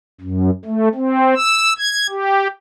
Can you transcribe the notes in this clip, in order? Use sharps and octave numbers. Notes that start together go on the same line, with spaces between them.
F#2
A3
C4
E6
G#6
G4